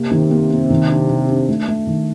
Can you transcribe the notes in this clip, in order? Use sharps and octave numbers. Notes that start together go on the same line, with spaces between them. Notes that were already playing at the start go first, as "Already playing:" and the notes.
Already playing: C3 A#3
D#3
A#3
A#3
D#3
D4
D#3
D4
A3
A3
D#3